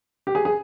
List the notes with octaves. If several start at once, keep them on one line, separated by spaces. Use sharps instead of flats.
G4
G#4
G#4